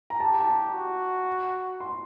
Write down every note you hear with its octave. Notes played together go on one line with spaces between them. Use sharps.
A#5
G4 A5
A5
A#5
F#4
C6